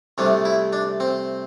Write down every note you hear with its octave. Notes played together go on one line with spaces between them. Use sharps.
C2 C3 A3 D4
E4
D4
C4